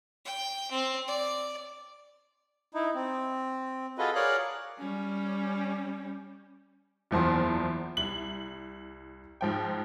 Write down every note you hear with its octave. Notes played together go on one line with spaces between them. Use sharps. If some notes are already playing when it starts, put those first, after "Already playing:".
G5
C4
D5
D#4 E4
C4
F4 F#4 G#4 A4 B4 D#5
G#4 A#4 C#5 D5 F5 F#6
G3 C#4
F#1 E2 F3 C5
C2 F#7
G#2 F3 G5